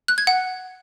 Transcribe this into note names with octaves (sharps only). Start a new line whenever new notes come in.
F#6
G#6
F#5